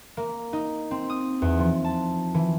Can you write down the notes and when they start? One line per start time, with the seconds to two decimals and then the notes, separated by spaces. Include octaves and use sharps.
0.17 A#3
0.53 D#4
0.91 C4
1.10 D#6
1.42 E2
1.59 F3
1.85 A5
2.34 E3